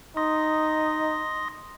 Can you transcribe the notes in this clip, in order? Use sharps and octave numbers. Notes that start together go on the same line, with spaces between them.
D#4 C6 D#6 A#6